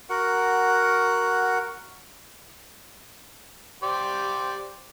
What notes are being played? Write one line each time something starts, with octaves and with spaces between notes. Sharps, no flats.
F#4 A#4 F#5
G4 C5 D5